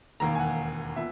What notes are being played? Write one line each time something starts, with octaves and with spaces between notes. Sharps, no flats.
E1 D#2 D#3 A#3 A#5
G#5
F#5
A#2 B3 E5